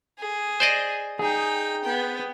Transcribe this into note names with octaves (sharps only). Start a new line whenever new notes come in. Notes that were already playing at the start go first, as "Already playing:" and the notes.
G#4
C5 D5 D#5
D#4 G#4 G5 G#5
B3 G5